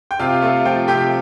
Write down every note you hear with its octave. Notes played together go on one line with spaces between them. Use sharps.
G5
C3 F4 F5
A3
F3 G5
C3 G4 G5